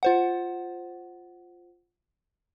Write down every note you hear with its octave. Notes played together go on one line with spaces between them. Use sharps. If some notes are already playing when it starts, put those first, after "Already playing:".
F4 C5 F#5